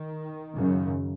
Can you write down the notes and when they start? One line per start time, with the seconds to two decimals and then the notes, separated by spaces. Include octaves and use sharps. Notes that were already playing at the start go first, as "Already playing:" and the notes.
Already playing: D#3
0.53 F#2 C#3